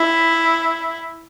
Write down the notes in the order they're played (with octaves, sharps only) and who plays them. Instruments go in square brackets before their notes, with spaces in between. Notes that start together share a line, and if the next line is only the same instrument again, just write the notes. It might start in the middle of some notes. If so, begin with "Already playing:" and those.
Already playing: [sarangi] E4